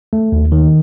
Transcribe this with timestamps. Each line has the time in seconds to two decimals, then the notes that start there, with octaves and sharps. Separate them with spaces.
0.13 A3
0.32 D#2
0.52 D#3